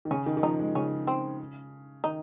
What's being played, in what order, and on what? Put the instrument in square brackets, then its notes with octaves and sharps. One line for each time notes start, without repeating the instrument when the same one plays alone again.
[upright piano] D#3
[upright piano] C#3 [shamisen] C#4
[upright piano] D#3
D#3
[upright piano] F3 [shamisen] D#4
[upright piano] G#3
[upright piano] C#3 [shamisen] C#4
[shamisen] C4
[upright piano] D#3 [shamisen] D#4